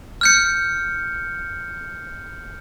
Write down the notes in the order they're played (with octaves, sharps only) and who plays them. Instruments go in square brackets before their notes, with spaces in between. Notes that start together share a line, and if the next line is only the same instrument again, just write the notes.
[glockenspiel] F6 G6 C#7